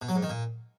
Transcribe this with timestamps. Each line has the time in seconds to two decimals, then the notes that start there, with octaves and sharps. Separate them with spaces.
0.02 B2
0.09 F#3
0.16 G#2
0.23 D#3
0.30 A#2